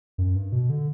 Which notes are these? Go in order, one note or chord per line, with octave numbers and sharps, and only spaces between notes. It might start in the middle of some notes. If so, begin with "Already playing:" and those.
F#2
G2
B2
D3